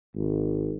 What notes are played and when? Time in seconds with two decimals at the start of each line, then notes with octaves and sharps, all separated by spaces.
0.15 G#1